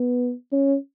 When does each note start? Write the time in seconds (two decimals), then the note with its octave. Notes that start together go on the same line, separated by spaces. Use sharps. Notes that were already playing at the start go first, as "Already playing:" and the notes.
Already playing: B3
0.52 C#4